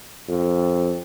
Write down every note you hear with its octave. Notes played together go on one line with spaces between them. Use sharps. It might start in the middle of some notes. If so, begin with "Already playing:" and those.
F2